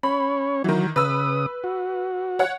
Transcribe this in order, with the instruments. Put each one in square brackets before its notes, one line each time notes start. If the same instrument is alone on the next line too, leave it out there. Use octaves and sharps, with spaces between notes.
[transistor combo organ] C#4 C#5 [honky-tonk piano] B5
[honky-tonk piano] D#3 E3 [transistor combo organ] F#3
[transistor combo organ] C#3 D#6 [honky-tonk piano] B4 E6
[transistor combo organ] F#4
[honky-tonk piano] C#5 F#5